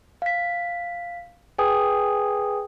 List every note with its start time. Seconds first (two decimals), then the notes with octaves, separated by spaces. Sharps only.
0.22 F5 B6
1.58 G#4 B4 G5 G#5 D#6